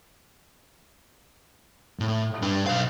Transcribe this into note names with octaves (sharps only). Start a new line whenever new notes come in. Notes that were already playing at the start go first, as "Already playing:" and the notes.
A2
G2 D4
B1 F5